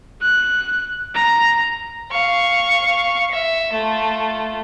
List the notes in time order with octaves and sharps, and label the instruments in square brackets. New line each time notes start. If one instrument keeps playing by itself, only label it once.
[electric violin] F#6
A#5
[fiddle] F5 C#6
E5
A3 F4